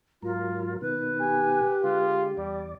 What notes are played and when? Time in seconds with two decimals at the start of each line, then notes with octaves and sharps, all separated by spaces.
0.22 G#2 F#3 F4 A#4
0.81 B2 D#3 B4
1.21 G4 G#5
1.84 D3 G#3 F4
2.37 E2 G3 D5